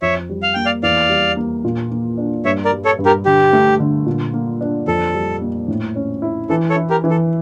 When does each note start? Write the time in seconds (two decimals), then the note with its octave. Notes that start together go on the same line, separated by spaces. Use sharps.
0.02 F2 C#5 E5
0.29 G3
0.43 F5
0.54 A#3 G5
0.65 D5 F5
0.83 E2 D5 F5
1.09 G3
1.36 A#3
1.64 A#2
1.91 A#3
2.18 D4
2.45 G2 C#5 E5
2.65 A#4 D5
2.72 G3
2.85 A4 C#5
2.99 G2
3.06 G4 A#4
3.26 D3 G4
3.53 A3
3.80 D3
4.06 A#2
4.34 A#3
4.61 D4
4.87 F2 A4
5.14 G3
5.42 A#3
5.68 A2
5.96 C#4
6.22 E4
6.49 E3 A4
6.70 A4 C#5
6.76 E4
6.90 G4 A#4
7.04 E3
7.10 A4